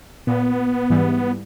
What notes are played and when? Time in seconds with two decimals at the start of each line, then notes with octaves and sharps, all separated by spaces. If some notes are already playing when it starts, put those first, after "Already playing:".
0.27 A#2 B3
0.90 G#2 E3 G3